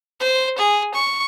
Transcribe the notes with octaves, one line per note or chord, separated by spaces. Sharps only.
C5
G#4
C#6